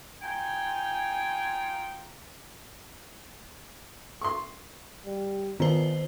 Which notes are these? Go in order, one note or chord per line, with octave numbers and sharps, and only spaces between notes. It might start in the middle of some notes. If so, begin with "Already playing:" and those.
D#4 F4 G5 G#5
C6 C#6
G3
A#2 D#3 F3 B3 C5